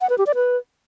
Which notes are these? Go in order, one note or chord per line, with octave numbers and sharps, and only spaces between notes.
F#5
B4
G4
D5
B4